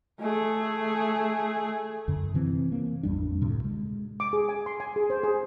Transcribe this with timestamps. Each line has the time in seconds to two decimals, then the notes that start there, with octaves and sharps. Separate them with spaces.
0.20 A3 G#4
2.08 F#2 D3
2.34 C3 E3 C4
2.72 A#3
3.03 A1 F2 G3 D4
3.41 D2 A2 C3
3.64 G#3
4.20 D6
4.33 G#4
4.49 G#5
4.66 C6
4.80 G#5
4.96 G#4
5.10 C5
5.23 G#4